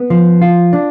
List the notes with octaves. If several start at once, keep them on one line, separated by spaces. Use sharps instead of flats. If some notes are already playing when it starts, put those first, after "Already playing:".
Already playing: B3
F3
F4
D4